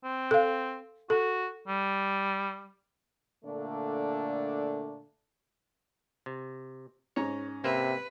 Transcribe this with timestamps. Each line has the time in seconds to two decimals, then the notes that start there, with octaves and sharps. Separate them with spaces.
0.04 C4
0.31 A4 F5
1.10 F#4 A4
1.68 G3
3.44 A#2 D3 A3 A#3 D4
6.26 C3
7.16 G#2 C#4 C#5 A#5
7.64 C3 A#3 B4 C5 E5